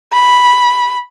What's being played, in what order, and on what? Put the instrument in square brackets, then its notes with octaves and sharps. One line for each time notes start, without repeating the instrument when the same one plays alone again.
[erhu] B5